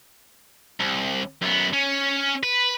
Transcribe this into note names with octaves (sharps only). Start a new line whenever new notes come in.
C2
F#2 B3
C#4
B4